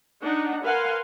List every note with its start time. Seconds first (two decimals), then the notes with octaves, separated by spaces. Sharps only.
0.23 D4 D#4 F#5
0.63 A#4 B4 F5 F#5 G#5 C6